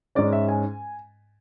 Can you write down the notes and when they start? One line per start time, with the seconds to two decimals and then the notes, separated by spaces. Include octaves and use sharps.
0.15 G#2 G#3 C#4 D5
0.33 E5
0.49 G#5